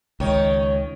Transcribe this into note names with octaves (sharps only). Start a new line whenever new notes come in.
C#2 D#3 C#5